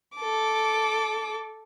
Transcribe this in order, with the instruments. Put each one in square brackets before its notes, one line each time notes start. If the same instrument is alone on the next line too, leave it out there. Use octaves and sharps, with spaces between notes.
[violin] A4 D6